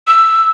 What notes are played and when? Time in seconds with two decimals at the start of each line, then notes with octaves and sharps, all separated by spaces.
0.08 E6